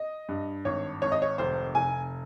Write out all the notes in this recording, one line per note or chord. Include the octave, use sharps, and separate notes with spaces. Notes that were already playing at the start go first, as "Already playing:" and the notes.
Already playing: D#5
G2
G#1 C#5
G#1 C#5
D#5
C#5
F1 C5
F1 G#5